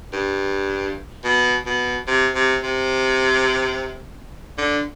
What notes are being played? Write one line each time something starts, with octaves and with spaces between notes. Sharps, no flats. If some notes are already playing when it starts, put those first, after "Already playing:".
G2
B2
B2
C3
C3
C3
D3